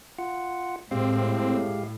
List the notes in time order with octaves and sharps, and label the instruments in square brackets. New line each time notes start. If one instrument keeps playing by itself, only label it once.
[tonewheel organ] F4 F#5
[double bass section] A2 [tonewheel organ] G#3 G4 F5 [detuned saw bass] C4